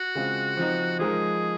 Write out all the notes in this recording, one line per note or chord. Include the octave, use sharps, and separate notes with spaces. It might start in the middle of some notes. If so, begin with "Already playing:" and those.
Already playing: F#4
C#3 G#3 C4 F4
F3 C4 D#4
F3 G#3 D#4 G#4 A#4